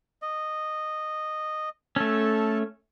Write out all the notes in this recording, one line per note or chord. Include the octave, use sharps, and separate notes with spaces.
D#5
A3 C#4 A4 A5